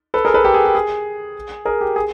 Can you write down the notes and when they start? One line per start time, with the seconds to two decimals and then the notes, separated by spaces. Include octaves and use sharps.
0.14 A4 B4
0.25 G#4 A#4
0.34 A4 B4
0.44 G4 A4
0.54 G#4
0.65 G4
0.75 G#4
1.65 G#4 A#4
1.81 G4
1.96 G#4